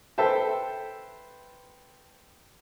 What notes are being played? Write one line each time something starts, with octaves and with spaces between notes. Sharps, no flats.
A4 B4 C5 E5 G5 A5